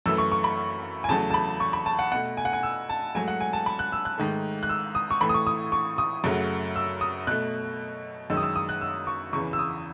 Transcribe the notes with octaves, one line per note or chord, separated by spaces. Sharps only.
F#2 E3 A3 E6
C#6
C#6
B5
G#5
E2 C#3 F#3 A3 A5
A5
B5
C#6
B5
A5
F#5
B2 A3 F#5
G#5
F#5
G#5
E6
A5
G#2 F#3 A3 G#5
F#5
G#5
A5
B5
F#6
E6
F#6
G#2 D#3 A3
F#6
E6
D#6
C#6
A2 E3 A3 B5
D#6
C#6
D#6
C#6
D#6
F#2 C#3 F#3 A3
E6
D#6
B2 A3 F#6
F#2 D#3 G#3 E6
D#6
E6
D#6
F#6
E6
C#6
E2 C#3 E3 C#6
E6
D#6